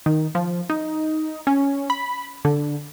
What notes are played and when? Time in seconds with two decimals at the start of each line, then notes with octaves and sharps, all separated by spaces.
0.06 D#3
0.35 F3
0.70 D#4
1.47 C#4
1.90 B5
2.45 D3